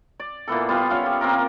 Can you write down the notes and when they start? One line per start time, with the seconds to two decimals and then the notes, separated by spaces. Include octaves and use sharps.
0.19 D5
0.47 A#2 E3 B3 A4
0.69 G3 B3 F4
0.90 F3 B3 C#4 F5
1.06 G3
1.21 A#3 C4 F4 A#4